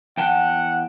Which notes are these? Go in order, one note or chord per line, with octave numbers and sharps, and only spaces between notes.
E2 F#5 G5 A5